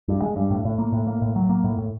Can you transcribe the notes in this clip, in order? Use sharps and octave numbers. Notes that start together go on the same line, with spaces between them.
G2
G#3
G2
A2
A2
A#3
A2
A#3
A2
F#3
A#3
A2
A2